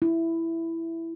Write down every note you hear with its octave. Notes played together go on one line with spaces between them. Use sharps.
E4